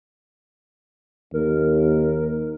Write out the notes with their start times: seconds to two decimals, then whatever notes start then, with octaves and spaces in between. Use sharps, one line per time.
1.34 D#2 A#4